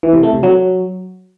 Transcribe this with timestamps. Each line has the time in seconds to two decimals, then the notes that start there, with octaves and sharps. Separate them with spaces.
0.03 E3
0.13 C3
0.23 A3
0.33 C3
0.43 F#3